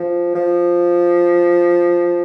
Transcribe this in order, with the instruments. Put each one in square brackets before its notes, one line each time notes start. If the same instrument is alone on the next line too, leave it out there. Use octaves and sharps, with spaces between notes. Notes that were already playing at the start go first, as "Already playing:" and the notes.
Already playing: [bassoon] F3
F3